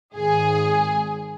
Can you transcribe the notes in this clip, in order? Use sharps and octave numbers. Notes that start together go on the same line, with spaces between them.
G#1 G#4